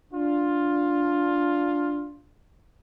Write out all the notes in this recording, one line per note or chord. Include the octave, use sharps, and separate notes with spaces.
D4 F4